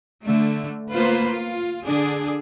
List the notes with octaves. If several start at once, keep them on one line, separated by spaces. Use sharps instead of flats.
D3 A3
A#3 B3 F4 B4 C5
F4
D3 D4 G#4